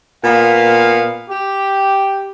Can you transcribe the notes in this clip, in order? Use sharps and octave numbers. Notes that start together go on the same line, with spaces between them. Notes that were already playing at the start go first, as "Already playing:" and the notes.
A#2 B3 F5
G4